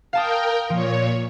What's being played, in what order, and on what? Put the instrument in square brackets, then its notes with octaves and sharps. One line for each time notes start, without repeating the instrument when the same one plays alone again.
[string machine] A#4 G5 [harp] F5 A5 D#6
[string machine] A#2 C#5 [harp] F3